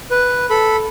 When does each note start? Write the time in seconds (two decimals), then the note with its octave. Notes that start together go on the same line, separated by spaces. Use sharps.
0.11 B4
0.50 A4 B5